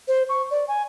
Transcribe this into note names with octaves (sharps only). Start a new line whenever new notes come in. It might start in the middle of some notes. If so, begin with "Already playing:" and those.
C5
C#6
D5
G#5